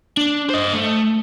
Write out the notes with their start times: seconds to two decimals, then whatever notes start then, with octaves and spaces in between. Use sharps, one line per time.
0.17 D4
0.50 C5 D#5
0.73 A3